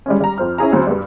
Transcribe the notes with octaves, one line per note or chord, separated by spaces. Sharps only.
G3 G#3 C#4
G3 A#5
F2 C5 F6
C#4 E4 G#4 A#5
D2 F#3 C4
G2 G3